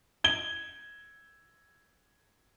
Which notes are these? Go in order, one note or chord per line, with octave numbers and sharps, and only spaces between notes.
G#6 G7